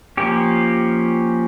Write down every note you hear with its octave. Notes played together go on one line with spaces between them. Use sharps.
F3 A#3 C#4 G4